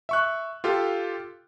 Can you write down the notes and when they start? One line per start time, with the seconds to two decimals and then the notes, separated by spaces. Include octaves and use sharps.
0.09 E5 C#6 F#6
0.64 F4 G4 A4 F5